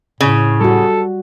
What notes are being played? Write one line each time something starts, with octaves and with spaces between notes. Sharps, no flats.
A2 C#3
G3 F#4 A4